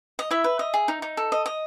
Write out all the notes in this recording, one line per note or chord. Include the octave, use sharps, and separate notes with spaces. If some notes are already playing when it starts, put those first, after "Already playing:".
D#5
E4 E5
B4
D#5
G#4
D#4
D#4
A4
D#5
D#5